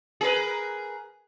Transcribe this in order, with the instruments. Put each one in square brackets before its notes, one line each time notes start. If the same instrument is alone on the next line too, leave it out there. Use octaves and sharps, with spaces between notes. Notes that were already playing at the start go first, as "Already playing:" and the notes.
[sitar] G#4 A#4 B4